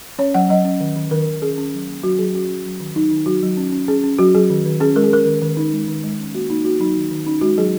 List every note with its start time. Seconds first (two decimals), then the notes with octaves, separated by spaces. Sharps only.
0.19 C#4 C#5
0.34 F#3 F#5
0.49 F#3 D#5
0.65 C#4
0.80 D#3
0.97 D#3
1.11 D#3 A#4
1.26 D#3
1.42 C#4 G#4
1.58 C#4
1.73 F#3
1.88 A#3
2.03 F#3 F#4
2.19 F#3 G#4
2.34 C#4 F#4
2.50 C#4
2.65 F#3
2.80 D#3
2.96 F#3 D#4
3.11 D#3
3.26 F#3 F#4
3.43 F#3
3.57 C#4
3.72 C#4
3.88 C#4 G#4
4.04 C#4
4.19 F#3 F#4
4.35 F#3 G#4
4.50 D#3
4.65 D#3
4.80 C#4 G#4
4.96 G#3 A#4
5.04 G#4
5.11 C#4 A#4
5.26 D#3
5.42 D#3
5.57 D#3 D#4
5.73 G#3
5.88 D#3
6.04 G#3
6.19 C#4
6.34 A#3 F#4
6.50 A#3 D#4
6.64 A#3 F#4
6.80 F#3 D#4
6.96 D#3
7.11 D#3
7.26 C#4 D#4
7.41 G#3 F#4
7.58 F#3 G#4